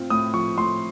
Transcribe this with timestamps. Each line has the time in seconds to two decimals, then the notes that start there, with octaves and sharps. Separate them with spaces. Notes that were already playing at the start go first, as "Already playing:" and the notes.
Already playing: A2 C4 F4
0.10 A2 D#6
0.34 F3 C#6
0.58 A2 C6